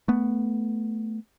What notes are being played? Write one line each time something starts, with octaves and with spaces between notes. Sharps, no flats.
A3 B3